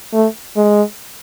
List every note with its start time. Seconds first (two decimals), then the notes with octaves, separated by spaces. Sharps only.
0.13 A3
0.56 G#3